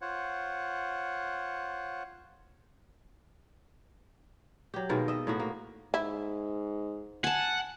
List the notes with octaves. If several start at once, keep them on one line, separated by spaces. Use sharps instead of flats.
F4 C5 C#5 F#5
F#3 G4
B2 D#3 G#3 A#3
D#5 E5
A2 A#3 F#4
A#3
G#2 E4
F#5 G#5 A5